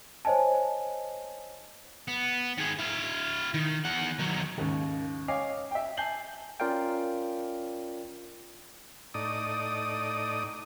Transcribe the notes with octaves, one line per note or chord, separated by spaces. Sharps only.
C5 C#5 D#5 G#5 A5
B3
D#3 G#4
E4 F5
D#3
E2 F#5
D#3 F#3
D#2 G#2 C#3
C#5 D#5 F5 G#5 D6 C7
E5 G5
G#5 A5 G6 C7 F#7 G7
C#4 F4 A#4 D5 F5 G5
A2 D#4 D5 D#6